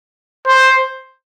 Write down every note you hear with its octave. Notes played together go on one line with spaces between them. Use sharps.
C5